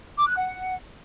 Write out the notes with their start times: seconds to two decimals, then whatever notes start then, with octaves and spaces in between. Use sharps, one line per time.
0.17 D6
0.26 F#6
0.35 F#5